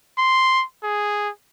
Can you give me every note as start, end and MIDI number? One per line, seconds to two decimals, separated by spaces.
0.18 0.64 84
0.83 1.29 68